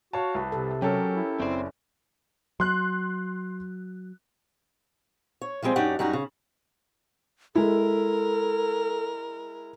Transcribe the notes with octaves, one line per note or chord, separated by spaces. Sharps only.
F#4 C#5 F5 A5
C2 B4 A5
C3 A4
F#3 C#4 G4 A4 A#4
E4
F#1 C4 C5 D5
F#3 C6 F#6
C#5
F3 G3 G#3 C4
F#2 D4 D#4 G4 C#5 F#5
F#2 G3 D#4 F#4
C#3
G#3 E4 A4 A#4